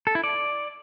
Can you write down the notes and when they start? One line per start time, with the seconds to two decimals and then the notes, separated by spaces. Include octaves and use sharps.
0.07 A4
0.15 E4
0.24 D5